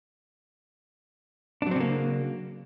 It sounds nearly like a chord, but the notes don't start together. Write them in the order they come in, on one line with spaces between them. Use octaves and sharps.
D4 F#3 C4 C#3 A#3